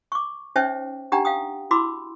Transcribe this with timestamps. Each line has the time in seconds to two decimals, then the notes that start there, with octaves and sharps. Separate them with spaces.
0.12 C#6 D6
0.56 C#4 D#4 C5 C#5 E5 G5
1.12 D4 D#4 G4 F#5 G5 A#5
1.25 F5 G5 D#6
1.71 E4 F#4 B5 C6 D6 E6